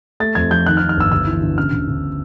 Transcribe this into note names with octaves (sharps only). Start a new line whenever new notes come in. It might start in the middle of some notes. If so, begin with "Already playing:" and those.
A3 A6
F2 G#6
F3 G6
D#3 F#6
F6
D#3
F6
G1 E6
D2 E6
E3
D2
C#3 F6
D2
D2